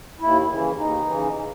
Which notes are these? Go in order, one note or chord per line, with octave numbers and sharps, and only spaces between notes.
D#2 E4
C#3 E3
D#2 D#4
C#3 E3